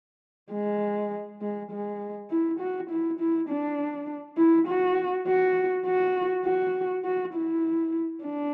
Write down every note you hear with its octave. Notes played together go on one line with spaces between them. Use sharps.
G#3
G#3
G#3
E4
F#4
E4
E4
D4
E4
F#4
F#4
F#4
F#4
F#4
E4
D4